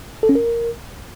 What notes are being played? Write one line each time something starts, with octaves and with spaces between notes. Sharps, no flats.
A4
C#4
A#4